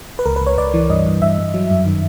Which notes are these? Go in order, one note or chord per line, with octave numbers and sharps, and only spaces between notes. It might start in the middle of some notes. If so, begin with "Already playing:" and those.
B4
C#2 A#4
B4
C#2
C#5
C#2 D5
E3
G2 D#5
G2
G2 E5
G2
F#3
F#2
D#3